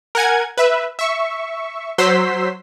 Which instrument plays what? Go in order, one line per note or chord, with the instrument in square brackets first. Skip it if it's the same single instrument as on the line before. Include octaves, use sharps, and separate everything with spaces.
[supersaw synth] A#4 F#5 G#5 G#6
B4 E5
E5 C#6
F#3 C5 C6 E6 B6